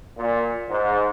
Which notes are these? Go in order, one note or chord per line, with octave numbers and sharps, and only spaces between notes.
A#2
G#2